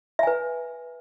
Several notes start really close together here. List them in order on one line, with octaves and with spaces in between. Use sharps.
E5 G#5 B4